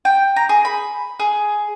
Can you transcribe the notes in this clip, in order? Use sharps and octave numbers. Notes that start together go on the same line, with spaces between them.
G5
A#5
G#4
B5
G#4